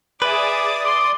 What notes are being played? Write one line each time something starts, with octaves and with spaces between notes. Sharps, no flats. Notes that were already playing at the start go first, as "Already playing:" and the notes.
G#4 B4 D5 E5 D6 D#6
C6 D6